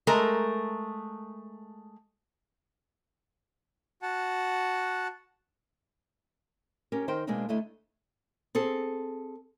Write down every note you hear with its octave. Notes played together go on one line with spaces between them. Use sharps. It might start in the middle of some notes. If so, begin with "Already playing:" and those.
G#3 A3 A#4 A#5
F#4 F#5 A5
C#4 G4 A#4
D#3 A#4 C5 D#5 G5
B2 G#3 A#3 C4 D4 D#4
D2 D3 A3 E4 D#5
C4 G#4 A4